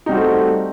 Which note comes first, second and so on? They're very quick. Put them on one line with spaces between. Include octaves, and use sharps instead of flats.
D#4 G3 F#4 C4 A3